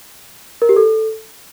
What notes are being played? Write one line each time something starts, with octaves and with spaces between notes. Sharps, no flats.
A#4
G4
A4